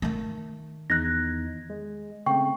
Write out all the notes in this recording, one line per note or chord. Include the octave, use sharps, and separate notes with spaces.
D#3 A3
E2 D#4 F#6 G#6 A#6
G#3
C#3 A3 C4 G5 C#6